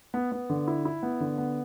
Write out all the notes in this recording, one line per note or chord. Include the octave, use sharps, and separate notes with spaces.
B3
B3
D3
E4
E4
B3
D3
B3